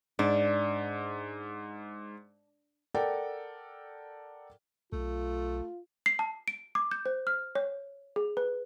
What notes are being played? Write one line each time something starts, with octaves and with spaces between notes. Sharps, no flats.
G#2 D4
A4 A#4 D5 F#5 G5
B1 A3 F4
C7
A5
D7
D6
G6
C5
F6
C#5
G#4
B4